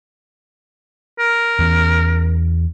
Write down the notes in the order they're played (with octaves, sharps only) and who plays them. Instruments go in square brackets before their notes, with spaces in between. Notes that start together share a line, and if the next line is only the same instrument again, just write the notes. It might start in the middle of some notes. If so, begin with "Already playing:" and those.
[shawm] A#4
[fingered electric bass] E2 E3 C#4